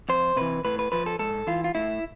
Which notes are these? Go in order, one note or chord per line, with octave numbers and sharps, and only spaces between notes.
F2 C5
C3 E3 B4
A2 B4
B4
F3 B4
A4
G#2 A4
E3 F4
F4
A2 E4